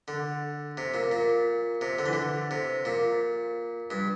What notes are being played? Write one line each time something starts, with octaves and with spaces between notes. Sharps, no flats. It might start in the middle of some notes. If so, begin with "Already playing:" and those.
D3
C3
A#2
A#2
C3
D3
E3
D3
C3
A#2
G2